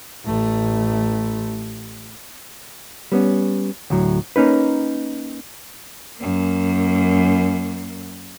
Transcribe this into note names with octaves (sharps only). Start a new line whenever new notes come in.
A1 A3
G3 B3 C#4
D2 A2 F#3
A#3 C#4 D#4 B4
F#2 A#3